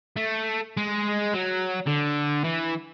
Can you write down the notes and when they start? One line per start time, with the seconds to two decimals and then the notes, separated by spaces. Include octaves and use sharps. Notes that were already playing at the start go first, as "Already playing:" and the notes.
0.17 A3
0.77 G#3
1.34 F#3
1.86 D3
2.44 E3